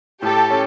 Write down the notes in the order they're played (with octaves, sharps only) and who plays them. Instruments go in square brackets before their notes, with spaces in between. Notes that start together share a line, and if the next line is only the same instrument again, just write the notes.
[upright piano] A2 [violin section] G4 A4
[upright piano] C#4